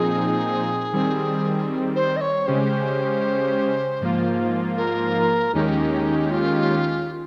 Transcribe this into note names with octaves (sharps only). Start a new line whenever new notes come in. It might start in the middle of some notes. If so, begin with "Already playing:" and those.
Already playing: A#2 F3 C4 D#4 G#4
D#3 G3 C4
C5
D#5
C#5
C#3 G#3 C#4 G4 C5
G#2 F3 A#3 F4
A#4
D#2 D#3 G#3 C#4 D#4 G4
F4